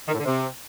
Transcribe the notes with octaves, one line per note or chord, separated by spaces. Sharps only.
D#3
A2
D3
C3